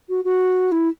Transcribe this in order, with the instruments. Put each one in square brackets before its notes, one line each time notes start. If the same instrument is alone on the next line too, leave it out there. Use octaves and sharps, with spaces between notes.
[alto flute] F#4
F#4
E4